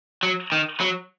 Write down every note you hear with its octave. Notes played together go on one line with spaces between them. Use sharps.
F#3
D#3
F#3